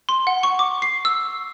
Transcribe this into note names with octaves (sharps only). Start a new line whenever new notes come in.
C6
F#5
C#6
D6
C7
E6